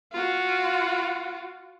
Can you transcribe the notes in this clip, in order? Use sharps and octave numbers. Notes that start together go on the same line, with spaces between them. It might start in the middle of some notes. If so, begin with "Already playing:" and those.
F4 F#4